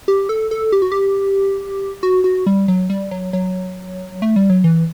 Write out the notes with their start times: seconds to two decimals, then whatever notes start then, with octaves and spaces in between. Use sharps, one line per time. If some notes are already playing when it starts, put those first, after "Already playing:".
0.08 G4
0.29 A4
0.51 A4
0.72 G4
0.82 F#4
0.92 G4
2.03 F#4
2.24 F#4
2.46 G3
2.68 F#3
2.90 G3
3.11 F#3
3.33 F#3
4.22 A3
4.36 G3
4.50 F#3
4.64 E3